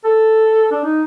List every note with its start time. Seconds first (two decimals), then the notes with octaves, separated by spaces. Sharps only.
0.05 A4
0.72 D4
0.84 D#4